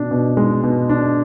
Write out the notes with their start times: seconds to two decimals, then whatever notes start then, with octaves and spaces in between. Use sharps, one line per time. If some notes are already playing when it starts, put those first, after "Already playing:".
Already playing: B2 D4
0.11 B2
0.37 G#3
0.63 B2
0.89 D4